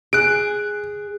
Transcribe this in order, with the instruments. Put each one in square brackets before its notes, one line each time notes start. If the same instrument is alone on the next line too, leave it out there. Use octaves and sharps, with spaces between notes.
[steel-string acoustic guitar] G#4 [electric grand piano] F#6 D7